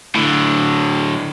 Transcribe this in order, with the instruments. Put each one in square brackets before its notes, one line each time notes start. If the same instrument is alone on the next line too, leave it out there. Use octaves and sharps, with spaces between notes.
[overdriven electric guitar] A2 D3